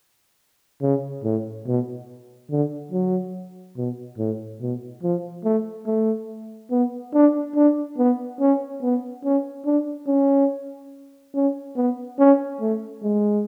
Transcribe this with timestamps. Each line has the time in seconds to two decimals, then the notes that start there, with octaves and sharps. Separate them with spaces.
0.82 C#3
1.24 A2
1.67 B2
2.51 D3
2.92 F#3
3.77 B2
4.18 A2
4.61 B2
5.03 F3
5.44 A3
5.87 A3
6.71 B3
7.14 D4
7.56 D4
7.98 B3
8.40 C#4
8.82 B3
9.24 C#4
9.66 D4
10.07 C#4
11.35 C#4
11.76 B3
12.19 C#4
12.61 A3
13.03 G#3